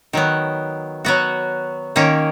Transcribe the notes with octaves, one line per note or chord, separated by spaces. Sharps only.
D#3 F#3 B3
F#3 B3 F#4
D#3 A#3 C#4